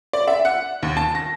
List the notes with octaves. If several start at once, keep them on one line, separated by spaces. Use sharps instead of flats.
D5
E5
F#5
D#2
A5
A#6